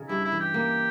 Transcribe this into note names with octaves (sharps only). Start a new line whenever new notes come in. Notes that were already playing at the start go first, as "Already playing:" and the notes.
Already playing: C#3 D#4
G2 E4
E4
E3
G4
A#3